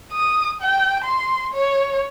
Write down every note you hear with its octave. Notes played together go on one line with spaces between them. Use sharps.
D#6
G5
C6
C#5